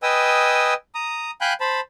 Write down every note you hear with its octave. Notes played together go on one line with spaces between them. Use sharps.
B4 D#5 G5 G#5 D#6 E6
A#5 D#6
F5 G5 G#5 B5 F#6 G6
C5 A5 B5